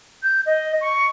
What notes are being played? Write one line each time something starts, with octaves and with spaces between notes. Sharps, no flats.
G6
D#5
C#6